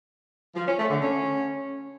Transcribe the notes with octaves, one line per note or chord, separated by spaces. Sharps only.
F3
C#4
A3
D3
C#4